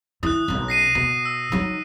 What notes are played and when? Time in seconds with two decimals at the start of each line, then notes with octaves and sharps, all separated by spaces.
0.23 E3 D#6 F#6
0.48 B1 C#4
0.68 A#6 C7 D#7
0.95 B2 D#7
1.25 E6
1.52 F#3 D#4